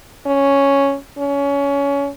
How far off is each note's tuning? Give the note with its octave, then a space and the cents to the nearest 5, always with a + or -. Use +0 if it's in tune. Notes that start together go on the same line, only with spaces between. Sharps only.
C#4 +0
C#4 +25